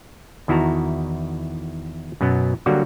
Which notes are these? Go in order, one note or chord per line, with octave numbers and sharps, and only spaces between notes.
E2 D#3 E4 F#4 A5 A#5
F#2 B2 F#3 B3
D3 F#3 G3 A#3 F#4